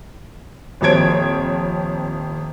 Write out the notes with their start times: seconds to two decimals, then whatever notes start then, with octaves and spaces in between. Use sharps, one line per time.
0.81 D#1 F2 C5 C#5 G#6 D7